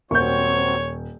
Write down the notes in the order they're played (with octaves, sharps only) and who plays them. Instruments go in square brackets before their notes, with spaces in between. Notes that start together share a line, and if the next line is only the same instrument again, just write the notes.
[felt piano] D#1 [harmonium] F#3 C4 F#4 [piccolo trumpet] C#5 [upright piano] C#6 G6